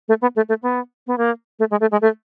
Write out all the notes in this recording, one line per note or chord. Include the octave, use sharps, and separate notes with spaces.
A3
B3
A3
A3
B3
B3
A#3
A3
G#3
A3
G#3
A3